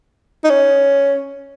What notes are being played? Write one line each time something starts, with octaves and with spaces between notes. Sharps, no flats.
D#4
C#4